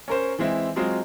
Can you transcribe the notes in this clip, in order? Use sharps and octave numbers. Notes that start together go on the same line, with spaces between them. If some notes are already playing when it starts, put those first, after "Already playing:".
C#4 A#4 C5
E3 G#3 C4 E4
F#3 G#3 C4 F4 D#5